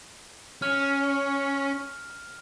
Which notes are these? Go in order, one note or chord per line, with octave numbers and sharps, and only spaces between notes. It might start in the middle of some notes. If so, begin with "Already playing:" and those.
C#4 F6